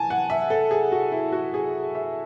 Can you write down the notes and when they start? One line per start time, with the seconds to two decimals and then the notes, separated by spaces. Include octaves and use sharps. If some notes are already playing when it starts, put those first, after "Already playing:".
Already playing: E3 G#5 A5
0.10 F#5
0.30 E5
0.50 A4
0.71 G#4
0.92 F#4
1.12 E4
1.32 F#4
1.54 G#4
1.95 E5